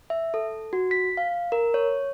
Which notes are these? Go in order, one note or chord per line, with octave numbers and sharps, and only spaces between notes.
E5
A4
F#4
B6
F5
A#4
C#5